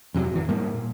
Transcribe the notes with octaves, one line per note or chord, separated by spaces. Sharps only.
F2 C3 E3 F#3
G#1 F2 E3
G#2 G3 A#3
A#2